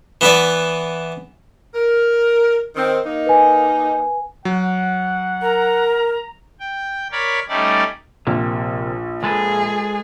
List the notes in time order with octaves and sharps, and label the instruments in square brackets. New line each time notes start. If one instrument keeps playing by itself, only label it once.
[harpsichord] E3 B3 E4 B4 D5
[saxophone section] A#4
D#3 C4
A#3 D#4
[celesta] B4 G#5
[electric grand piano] F#3 [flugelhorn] F#5
[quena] A#4 [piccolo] A#5
[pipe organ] G5
A#4 C#5 D5 B5
G3 A3 C#4 D#4 D5
[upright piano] A#1 [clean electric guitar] C3 A#3
[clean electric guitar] G#3 A4 B4 [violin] G#4